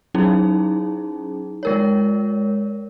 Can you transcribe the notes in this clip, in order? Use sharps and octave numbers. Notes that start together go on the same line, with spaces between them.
F#3 C#4 D#4 E4 G#4
G#3 A#4 C#5